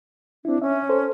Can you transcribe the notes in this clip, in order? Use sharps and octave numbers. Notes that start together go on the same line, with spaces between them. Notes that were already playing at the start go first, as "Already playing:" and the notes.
C4 D4 E4
C#4 C#5 E5
A4 C5